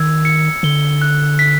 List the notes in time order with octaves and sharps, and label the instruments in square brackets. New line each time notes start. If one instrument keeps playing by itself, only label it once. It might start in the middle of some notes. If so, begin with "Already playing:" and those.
Already playing: [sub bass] D#3 [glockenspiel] E6 G#6
[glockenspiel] C#7
[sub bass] D3 [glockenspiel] G7
[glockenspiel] F#6
B6